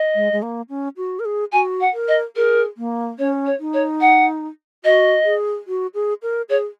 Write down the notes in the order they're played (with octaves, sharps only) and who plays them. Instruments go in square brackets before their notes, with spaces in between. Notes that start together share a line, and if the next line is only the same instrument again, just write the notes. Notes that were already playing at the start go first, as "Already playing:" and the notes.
Already playing: [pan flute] D#5
[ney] G#3
G#3
A#3
C#4
F#4
A#4
G#4
[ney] F#4 [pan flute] G#5
[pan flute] F#5
[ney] A#4
[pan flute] D#5
[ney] G#4 [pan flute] A#4
[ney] A#3
[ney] C#4 [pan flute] C#5
[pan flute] C#5
[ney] D#4
[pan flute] C#5
F#5
[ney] F#4 [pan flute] D#5
[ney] G#4
F#4
G#4
A#4
[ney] G#4 [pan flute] C#5